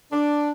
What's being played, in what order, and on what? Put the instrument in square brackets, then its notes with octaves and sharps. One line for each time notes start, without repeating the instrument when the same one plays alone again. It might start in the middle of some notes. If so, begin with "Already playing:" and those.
[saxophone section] D4